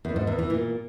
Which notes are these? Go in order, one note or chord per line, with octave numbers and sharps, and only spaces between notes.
E2
G#2
E2
E3
A#2